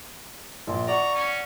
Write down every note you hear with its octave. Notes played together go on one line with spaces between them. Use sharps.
A#1 C6
D5 F#5 A#5 C#6
C#4